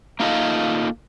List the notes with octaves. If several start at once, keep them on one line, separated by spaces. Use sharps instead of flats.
A#3 D#4 F4 A4 D#5